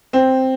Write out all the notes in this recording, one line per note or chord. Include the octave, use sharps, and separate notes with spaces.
C4